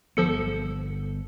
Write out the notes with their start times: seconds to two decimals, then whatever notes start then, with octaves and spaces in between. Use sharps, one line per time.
0.17 G1 F3 B3 A4 C#7